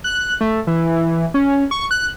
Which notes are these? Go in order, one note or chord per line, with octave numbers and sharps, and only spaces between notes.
F#6
A3
E3
C#4
C#6
F#6